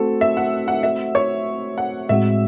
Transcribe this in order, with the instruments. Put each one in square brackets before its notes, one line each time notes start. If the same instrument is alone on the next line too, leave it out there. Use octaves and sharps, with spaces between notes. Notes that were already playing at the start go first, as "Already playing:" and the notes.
Already playing: [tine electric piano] A3 C4 F#4 C5 [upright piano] A4
[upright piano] E5
F#5
F#5
E5
C#5
F#5
[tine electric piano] A2 G#3 C4 F#4 [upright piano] E5